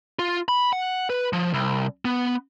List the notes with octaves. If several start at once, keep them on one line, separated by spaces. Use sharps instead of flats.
F4
B5
F#5
B4
F3
C2
B3